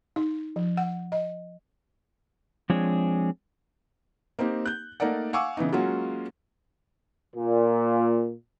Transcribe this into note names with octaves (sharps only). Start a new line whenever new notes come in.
D#4
F3
F#5
D#5
F3 G#3 C4 D4 G#4 C#5
A#3 C4 D#4 G4
F#6 G6
A3 A#3 D#4 A#4 D5 F#5
F5 F#5 G#5 C#6 D6 E6
C#3 E3 B3 D#4
F#3 G#3 A#3 C#4 F4 F#4
A#2